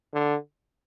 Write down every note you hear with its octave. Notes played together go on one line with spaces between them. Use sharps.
D3